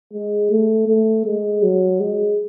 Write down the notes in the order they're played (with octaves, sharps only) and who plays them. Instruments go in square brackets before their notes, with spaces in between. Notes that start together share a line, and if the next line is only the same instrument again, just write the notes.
[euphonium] G#3
A3
A3
G#3
F#3
G#3